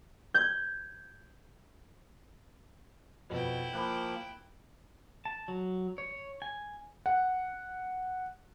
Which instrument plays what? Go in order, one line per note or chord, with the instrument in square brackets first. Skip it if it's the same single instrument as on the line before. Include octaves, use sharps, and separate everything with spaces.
[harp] G6 G#6
[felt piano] F2 B2 [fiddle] E4 G5
[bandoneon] F3 A#3 [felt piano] B5 D6 F#6
[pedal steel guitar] A5
F#3
C#5
G#5
[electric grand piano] F#5